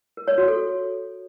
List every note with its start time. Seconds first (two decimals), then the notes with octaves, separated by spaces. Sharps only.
0.17 A#4
0.28 C#5
0.38 F#4
0.48 A4